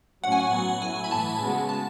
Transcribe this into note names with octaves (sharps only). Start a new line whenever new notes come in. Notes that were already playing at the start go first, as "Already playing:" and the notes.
A2 F#3 C#4 F#4 F#5
G#5
F#5
A2 F#3 B3 F#4
F#3 A3 E4 G#5
B5
A2 E3 B3 A5
C#3 G#3 B3 F#4
A5